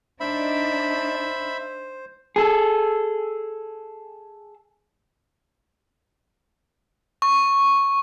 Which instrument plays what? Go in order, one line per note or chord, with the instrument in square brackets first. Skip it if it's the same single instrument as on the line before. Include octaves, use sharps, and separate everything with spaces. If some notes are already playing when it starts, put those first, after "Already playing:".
[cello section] D4 D#4 [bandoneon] C5 [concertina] E5 B5
[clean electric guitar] G#4 A4
[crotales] C#6